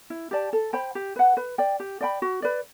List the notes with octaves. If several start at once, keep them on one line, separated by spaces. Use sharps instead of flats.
E4
G4 D5 A5
A4
C5 G5 B5
G4
B4 F#5
B4
D5 G5
G4
D5 G5 B5
F#4
B4 D5